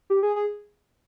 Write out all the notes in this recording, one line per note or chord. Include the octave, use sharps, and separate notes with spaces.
G4
G#4
G#4